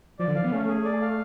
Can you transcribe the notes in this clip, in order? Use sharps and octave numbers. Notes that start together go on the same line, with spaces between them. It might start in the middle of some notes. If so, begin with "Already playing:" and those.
F3 D5
D3
F3 F5
B3
A3 C#4
G#4
D5
F5